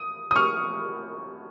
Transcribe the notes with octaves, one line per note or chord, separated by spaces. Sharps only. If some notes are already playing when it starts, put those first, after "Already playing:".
Already playing: D#6
D#6
C#6 F6